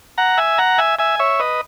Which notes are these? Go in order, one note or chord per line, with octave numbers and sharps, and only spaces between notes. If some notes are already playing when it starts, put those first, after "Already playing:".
F#5 A#5
E5 G#5
F#5 A#5
E5 G#5
E5 G#5
C#5 E5
B4 D#5